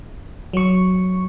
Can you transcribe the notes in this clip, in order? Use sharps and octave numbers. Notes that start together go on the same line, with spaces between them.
F#3 C#6